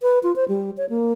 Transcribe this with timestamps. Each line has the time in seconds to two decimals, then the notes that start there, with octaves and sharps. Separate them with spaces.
0.02 B4
0.23 F4
0.36 C5
0.48 G3
0.77 C#5
0.90 A#3